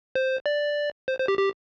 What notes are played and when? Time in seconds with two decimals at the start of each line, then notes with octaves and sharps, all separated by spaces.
0.15 C5
0.46 D5
1.08 C5
1.19 C5
1.28 G4
1.39 G4